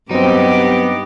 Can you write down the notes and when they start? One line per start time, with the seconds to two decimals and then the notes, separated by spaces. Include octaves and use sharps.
0.11 G2 F#3 B3 C4 D#4 G4